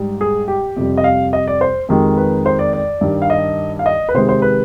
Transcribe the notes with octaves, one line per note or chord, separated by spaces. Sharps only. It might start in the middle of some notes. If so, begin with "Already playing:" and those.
Already playing: G#2 G3
G#4
G4
F2 C3 G3
D#5
F5
D#5
D5
C5
F2 D#3 G#3 G4
B4
C5
D5
D5
G2 D#3 G3
F5
D#5
F5
D#5
B4
C3 D#3 G#3 C5
C5
B4